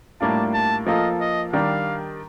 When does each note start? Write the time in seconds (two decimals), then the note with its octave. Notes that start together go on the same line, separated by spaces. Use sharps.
0.21 A2 G3 A#3 D4 F4 A5
0.54 A5
0.86 F3 A#3 F4 A4 D#5
1.21 D#5
1.53 D#3 G3 D4 F5